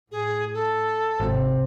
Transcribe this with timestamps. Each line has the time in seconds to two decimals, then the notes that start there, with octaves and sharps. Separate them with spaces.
0.12 A2 G#4
0.54 A4
1.20 G#1 C3 C4